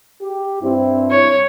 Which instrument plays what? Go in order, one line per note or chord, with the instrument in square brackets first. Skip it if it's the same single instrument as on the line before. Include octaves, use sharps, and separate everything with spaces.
[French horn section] G4
G2 C4 E4
[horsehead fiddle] C#5